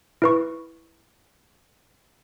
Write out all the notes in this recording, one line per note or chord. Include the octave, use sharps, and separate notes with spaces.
E4 B4 C#6